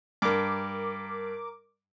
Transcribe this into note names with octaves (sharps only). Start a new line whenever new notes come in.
G2 A#4 D6